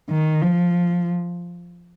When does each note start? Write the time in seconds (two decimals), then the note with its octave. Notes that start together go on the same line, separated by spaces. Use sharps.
0.10 D#3
0.41 F3